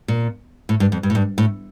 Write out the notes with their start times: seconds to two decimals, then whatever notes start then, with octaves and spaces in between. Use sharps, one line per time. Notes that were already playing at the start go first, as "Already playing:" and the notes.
0.08 A#2
0.69 A2
0.80 G2
0.92 F2
1.03 G2
1.10 A2
1.15 G2
1.38 A2